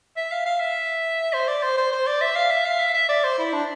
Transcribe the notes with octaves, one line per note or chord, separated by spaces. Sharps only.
E5
F5
F5
E5
C5
D5
C5
C5
C5
D5
E5
F5
E5
F5
E5
E5
D5
C5
E4
D4